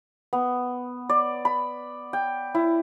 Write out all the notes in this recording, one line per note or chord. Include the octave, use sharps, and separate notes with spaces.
B3
D5
B5
G5
E4